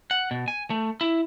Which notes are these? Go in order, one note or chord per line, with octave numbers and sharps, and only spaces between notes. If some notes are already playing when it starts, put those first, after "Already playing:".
F#5
B2
G#5
A3
E4